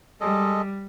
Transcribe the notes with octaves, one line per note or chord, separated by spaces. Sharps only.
G3 G#3 A4 D#5